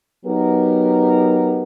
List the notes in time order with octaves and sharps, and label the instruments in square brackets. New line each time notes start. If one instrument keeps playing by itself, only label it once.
[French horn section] F#3 B3 D#4 G4 A#4